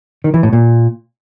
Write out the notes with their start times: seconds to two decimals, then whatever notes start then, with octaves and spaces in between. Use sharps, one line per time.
0.24 D#3
0.34 E3
0.43 A2
0.53 A#2